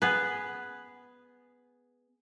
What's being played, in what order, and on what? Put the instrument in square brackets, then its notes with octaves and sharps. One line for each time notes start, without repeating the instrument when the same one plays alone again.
[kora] B3 G#4 B4